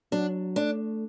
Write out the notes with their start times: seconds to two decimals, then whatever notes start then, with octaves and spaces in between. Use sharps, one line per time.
0.11 F#3 D4
0.56 A3 D4